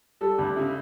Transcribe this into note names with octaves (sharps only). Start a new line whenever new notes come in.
G3 A4
D2 D4
C#3 E4